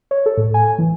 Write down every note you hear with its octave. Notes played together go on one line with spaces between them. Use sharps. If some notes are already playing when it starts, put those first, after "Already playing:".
C#5
A4
A2
G#5
E3